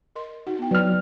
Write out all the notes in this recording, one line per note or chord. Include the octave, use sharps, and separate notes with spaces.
A#4 D#5 C6
D#4 F#4 F#5
B3 E4 G5
F#3 C4 B4 D5 F6